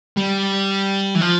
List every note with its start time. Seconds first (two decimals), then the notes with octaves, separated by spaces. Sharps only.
0.17 G3
1.15 E3
1.21 F3